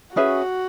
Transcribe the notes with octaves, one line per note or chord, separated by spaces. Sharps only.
C#4 F#4 G#4 B4 E5